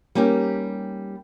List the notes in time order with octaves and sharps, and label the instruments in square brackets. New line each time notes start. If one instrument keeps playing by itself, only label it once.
[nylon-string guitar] G3 A#3 C#4 D#4 G4